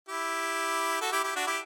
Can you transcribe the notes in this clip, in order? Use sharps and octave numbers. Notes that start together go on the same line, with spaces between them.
E4 G4
F#4 A4
E4 G4
E4 G4
D4 F#4
E4 G4